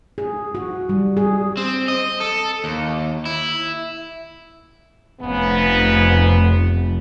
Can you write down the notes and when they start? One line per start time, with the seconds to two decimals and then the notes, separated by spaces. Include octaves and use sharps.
0.18 G#4
0.55 F#4
0.89 G3
1.17 G#4
1.57 C4
1.88 D#5
2.20 A4
2.64 D#2
3.25 E4
5.21 F1 G#2 C#3 B3